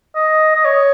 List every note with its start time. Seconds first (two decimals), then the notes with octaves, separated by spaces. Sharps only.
0.15 D#5
0.55 D#5
0.65 C#5